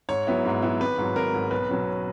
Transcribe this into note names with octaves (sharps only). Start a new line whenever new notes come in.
G#2 C#5
F#3 B3 E4
G#2
F#3 B3 E4
G#1 B4
G#2 F#3
G#1 A#4
G#2 F#3
B1 B4
B2 F#3 C#4